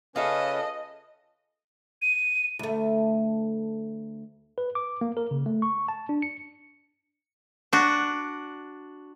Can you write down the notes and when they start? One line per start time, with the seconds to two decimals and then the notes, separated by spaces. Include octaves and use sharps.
0.16 C#3 C#4 F4 A4 B4 D#5 E5
2.02 D#7
2.59 D2 A3
4.58 B4
4.75 D6
5.01 A#3
5.17 A#4
5.31 C#3
5.46 A3
5.62 C#6
5.88 A5
6.09 D4
6.22 C#7
7.73 D4 F#4